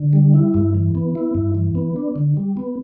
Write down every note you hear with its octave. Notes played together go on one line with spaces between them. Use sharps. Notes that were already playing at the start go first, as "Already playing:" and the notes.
Already playing: D3
G3
E4
G2
E3
B3
E4
G2
E3
B3
D4
D3
G3
B3